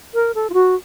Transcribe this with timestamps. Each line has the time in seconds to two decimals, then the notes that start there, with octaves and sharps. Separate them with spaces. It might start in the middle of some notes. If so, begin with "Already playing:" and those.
0.14 A#4
0.35 A4
0.50 F4
0.54 F#4